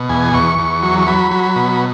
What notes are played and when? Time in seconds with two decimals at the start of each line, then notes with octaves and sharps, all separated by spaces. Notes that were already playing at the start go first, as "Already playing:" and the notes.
Already playing: B2
0.09 E2 G#5
0.34 E2 C#6
0.59 E2
0.83 F#3
0.99 C#6
1.07 F#3 B5
1.31 F#3
1.43 B5
1.56 B2